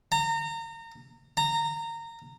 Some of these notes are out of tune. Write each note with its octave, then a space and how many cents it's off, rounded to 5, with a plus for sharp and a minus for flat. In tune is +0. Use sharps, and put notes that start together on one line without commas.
A#5 -30
A#5 -20